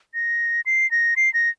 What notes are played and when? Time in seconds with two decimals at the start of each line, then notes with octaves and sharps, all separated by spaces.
0.14 A#6
0.66 C7
0.91 A#6
1.17 C7
1.34 A#6